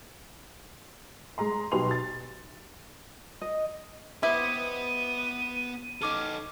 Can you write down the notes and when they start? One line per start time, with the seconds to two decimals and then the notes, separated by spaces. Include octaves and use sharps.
1.38 G#3 G#4 A#5 C6
1.72 B1 B2 G4 B4 C6 F7
1.91 A6
3.41 D#5
4.23 B3 E4 G4 B4 C5 D#5 D#7
6.02 C#4 D#4 A4 D6 F6